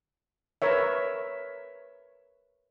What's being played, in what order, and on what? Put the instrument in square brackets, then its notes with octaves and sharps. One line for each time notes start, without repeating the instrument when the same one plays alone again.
[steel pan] A#4 B4 C#5 E5